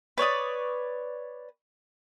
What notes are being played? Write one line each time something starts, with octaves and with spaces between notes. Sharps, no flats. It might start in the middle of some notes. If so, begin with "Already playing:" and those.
B4 C#5 D5 D#6